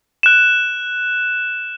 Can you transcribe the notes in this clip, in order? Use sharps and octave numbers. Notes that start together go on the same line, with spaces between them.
F#6 E7